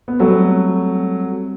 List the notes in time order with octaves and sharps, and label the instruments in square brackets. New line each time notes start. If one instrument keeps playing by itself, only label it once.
[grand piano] B3
[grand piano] F#3 A3 [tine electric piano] G3 C4 F#4